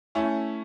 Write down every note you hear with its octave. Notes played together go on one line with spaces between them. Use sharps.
A3 C#4 E4